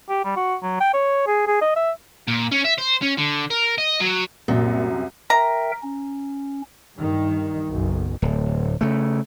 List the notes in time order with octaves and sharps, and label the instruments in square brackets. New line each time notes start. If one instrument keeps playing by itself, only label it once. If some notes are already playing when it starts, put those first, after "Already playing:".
[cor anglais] G4
G3
F#4
F#3
G5
C#5
G#4
G#4
D#5
E5
[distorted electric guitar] A#2
C#4
E5
C5
C#4
D3
A#4
D#5
F#3
[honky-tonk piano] C2 F#2 [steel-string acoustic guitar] A#2
[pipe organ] A#4 E5 G5 [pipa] A#5
[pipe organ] C#4
[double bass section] G2 D#3
F#1 B1 F#2
[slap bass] D1
C#3 A3